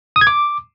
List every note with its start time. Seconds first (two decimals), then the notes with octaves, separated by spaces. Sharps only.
0.16 D#6
0.21 G#6
0.27 D6